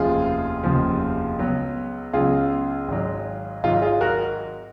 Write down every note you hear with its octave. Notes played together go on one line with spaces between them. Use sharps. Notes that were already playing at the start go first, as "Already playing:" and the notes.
Already playing: F1 D#2 C#3 F3 F4 G#4
F1 D#2 C#3 F3
C#2 C#3 F#3 B3
C#2 C#3 F#3 B3 F4 G#4
G#1 G#2 F#3
G#1 G#2 F#3 F4
F4 G#4
F#4 A#4